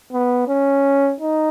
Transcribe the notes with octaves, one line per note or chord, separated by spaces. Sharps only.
B3
C#4
D#4